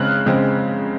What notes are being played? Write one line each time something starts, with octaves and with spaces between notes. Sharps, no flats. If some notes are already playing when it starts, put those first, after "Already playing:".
Already playing: C#3 G#3 C4 F6 F#6
C#3 G#3 C4